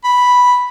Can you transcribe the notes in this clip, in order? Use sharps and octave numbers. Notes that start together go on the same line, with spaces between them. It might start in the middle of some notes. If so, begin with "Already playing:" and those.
B5